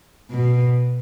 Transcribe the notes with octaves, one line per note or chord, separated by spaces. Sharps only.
B2